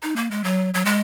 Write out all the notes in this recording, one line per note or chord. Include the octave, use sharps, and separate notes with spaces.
D#4
A#3
G#3
F#3
F#3
G#3